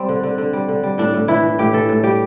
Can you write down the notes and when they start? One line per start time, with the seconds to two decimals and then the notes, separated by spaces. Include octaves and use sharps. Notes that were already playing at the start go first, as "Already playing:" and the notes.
Already playing: G3 C4
0.09 D3
0.23 D3
0.38 D3
0.53 G3
0.68 D3
0.83 G3
0.98 A2 D4
1.14 A2
1.28 E3 E4
1.43 E3
1.59 A2 G4
1.73 E3 A4
1.89 A2
2.03 G3 G4